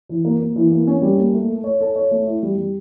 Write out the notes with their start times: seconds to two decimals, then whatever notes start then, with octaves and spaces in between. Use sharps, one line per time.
0.09 E3
0.25 A#3
0.40 A#3
0.56 E3
0.72 A#3
0.87 C#4
1.02 G3
1.18 A#3
1.34 A3
1.49 A4
1.64 C#5
1.81 A4
1.96 C#5
2.11 A3
2.27 E4
2.42 G3
2.57 G3